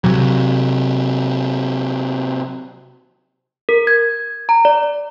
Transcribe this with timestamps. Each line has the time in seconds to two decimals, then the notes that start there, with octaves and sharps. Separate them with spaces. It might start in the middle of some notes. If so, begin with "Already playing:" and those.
0.04 C3 F#3
3.69 A#4
3.87 G#6
4.49 A#5
4.65 D5